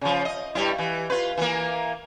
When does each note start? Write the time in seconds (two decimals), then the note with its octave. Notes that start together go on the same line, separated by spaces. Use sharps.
0.01 C#3 F3
0.25 D#5
0.55 G2 G3 E4
0.78 E3
1.10 F4 B4
1.37 E3 A#3